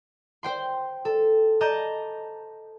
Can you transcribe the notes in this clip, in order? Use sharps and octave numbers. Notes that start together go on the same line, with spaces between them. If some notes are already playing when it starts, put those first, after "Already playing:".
C5 G5 C6
A4
D#5 A5 A#5 D6 G6